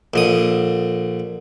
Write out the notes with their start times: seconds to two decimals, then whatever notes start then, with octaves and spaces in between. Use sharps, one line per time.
0.14 A#1 D3 D#6